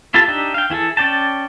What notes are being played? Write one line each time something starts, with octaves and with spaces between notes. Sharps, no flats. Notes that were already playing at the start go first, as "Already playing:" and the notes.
E4 F4 G4 A4 A5
D4 D#4 G4 E5
F5 G5
E3 E4 G#4 A4
C#4 D5 G5 A5